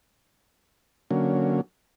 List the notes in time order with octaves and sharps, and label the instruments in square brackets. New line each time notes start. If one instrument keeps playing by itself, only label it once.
[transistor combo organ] D3 F#3 A#3 C#4